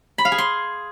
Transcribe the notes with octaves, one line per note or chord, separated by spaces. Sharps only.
B5
F5
G#4
C6